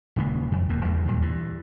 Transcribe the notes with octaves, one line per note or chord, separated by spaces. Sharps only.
D#1 C#3 G#3 A#3
F2
D#1 E2 A#3
E2 G3 G#3
D#2 A#2 F#3
G2 E3